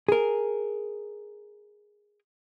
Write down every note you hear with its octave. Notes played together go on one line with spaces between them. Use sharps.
G#4 A#4